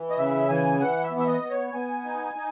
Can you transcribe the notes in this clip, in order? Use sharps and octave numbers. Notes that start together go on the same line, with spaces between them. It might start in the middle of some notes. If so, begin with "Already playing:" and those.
Already playing: E3
D#5
C#3 E5
E3 G#5
E3 F#5
E5
B3
E5
D#5
B3
C#5
B3 G#5
D#4
D#4